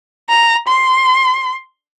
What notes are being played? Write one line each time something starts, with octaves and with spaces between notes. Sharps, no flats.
A#5
C6